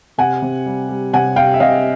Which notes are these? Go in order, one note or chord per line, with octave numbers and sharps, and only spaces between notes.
C3 F#5 G#5
C3
G3
G3
C3 F#5 G#5
C3 F5 G5
E5
C3 D#5 F5